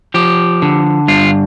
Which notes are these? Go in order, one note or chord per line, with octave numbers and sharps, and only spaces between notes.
F3 G4
D3
G2 F4